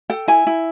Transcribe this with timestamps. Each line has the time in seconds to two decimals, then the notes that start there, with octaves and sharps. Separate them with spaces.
0.10 A4 G5
0.28 E4 G#5
0.47 E4